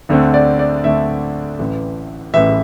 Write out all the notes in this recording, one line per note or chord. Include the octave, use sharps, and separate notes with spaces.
D2 D3 A3 C4
D5
D5
D2 D3 A3 C4 E5
A1 A2 E3
A1 A2 E3 E5